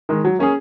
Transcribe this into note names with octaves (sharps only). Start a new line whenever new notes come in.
D#3 G#3
F#3
A#3 C#4 G#4